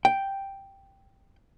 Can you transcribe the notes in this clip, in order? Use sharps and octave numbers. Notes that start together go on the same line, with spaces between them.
G5